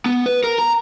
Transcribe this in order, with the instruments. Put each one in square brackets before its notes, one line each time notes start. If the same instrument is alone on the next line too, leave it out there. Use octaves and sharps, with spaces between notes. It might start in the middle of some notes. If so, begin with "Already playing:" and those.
[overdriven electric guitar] B3
B4
A#4
A#5